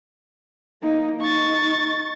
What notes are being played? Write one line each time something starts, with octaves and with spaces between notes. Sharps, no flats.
A#3 D#4
D#4 C#6 A6